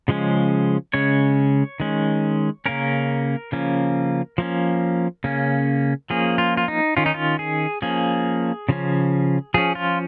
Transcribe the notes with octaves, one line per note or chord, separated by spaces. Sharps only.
C#3 F3 G#3 C#4
C#3 G#3 C#4 C#5
D#3 G#3 C#4
C#3 A#3 C#4 A#4
C#3 F3 A#3 C#4
F3 A#3 C#4
C#3 A#3 C#4
F3 A#3 C#4 G#4
F4
F4
D#4
D#3 C#4 F4
D#4
F4
G#4
F3 A#3 C#4 G#4
C#3 F3 C#4
F3 C#4 G#4
F4